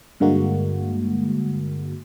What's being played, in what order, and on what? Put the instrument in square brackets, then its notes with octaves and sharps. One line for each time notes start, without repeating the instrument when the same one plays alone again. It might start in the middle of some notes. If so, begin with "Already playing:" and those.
[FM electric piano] G2 D3 G#3 A#3 F#4